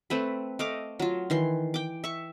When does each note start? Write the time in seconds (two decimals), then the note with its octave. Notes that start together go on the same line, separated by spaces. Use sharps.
0.10 A3 C4 B4
0.59 A3 D#5 F5 D6
0.99 F#3 F4
1.30 D#3 E3 C6
1.74 G5 D6
2.04 E5 C#6